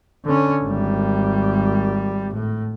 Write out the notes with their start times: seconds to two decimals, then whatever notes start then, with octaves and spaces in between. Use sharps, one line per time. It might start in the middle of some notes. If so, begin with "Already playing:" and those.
0.25 D3 C#4
0.64 G#1 G3
2.34 A2